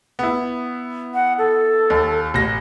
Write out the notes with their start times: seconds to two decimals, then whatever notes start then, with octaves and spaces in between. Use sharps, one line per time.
0.19 B3 E4
1.14 F#5
1.38 A4
1.90 D#2
2.34 A1 A#6